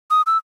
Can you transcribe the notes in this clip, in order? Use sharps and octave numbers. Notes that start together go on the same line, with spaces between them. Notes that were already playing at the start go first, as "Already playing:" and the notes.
D#6
E6